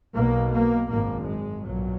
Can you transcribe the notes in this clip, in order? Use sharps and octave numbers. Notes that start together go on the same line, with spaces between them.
B1 B2 A#3
A#3
G#1 F#2 A#3
G#3
B1 A#2 F#3